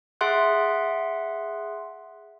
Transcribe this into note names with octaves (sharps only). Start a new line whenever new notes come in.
G#4 E5 F#5 C6 F#6